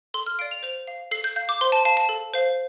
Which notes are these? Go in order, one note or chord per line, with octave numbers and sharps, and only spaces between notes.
A4 C6
F6
D5 F5 D7
F7
C5 F7
F5
A4 C7
G6
F5 G6
D6
C5 C6
A5
F5 A5
A5
A4
C5 F5